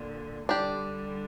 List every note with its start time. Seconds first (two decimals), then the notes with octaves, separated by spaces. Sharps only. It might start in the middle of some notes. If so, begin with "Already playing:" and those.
Already playing: A#2 D3
0.49 D3 G3 D4 G4 D5